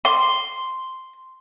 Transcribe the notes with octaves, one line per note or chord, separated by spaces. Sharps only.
C6